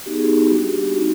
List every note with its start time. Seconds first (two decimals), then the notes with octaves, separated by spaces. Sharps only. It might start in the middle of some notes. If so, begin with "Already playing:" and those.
0.06 B3 D#4 F#4 G4
0.13 G#4
0.22 G4
0.46 G4
0.50 G3 A#3 D4 F#4
0.96 C4 D#4 F#4